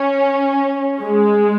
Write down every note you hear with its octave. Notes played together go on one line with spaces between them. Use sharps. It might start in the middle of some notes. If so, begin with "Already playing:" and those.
Already playing: C#4
G#3